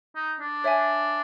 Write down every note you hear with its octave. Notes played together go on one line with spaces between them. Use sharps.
D#4
D4
C#5 E5 G#5